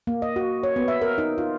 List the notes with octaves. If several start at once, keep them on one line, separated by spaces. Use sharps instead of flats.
A#3
D#5
F#4
C#5
B3
E5
A#4
D#4
F4